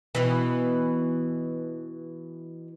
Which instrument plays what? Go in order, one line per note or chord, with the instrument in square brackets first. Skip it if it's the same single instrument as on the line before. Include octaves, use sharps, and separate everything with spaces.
[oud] B2 E3